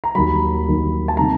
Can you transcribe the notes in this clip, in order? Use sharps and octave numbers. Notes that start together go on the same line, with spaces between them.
A#5
D#2 D#3 F#3 B5
D#2 D#3 F#3
A5
C3 D#3 A#5